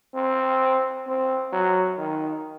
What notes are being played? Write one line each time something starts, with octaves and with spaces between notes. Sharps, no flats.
C4
C4
F#3
D#3